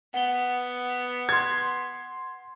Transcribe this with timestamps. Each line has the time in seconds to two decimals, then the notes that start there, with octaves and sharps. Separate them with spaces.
0.14 B3 F#5 G7
1.29 C6 G#6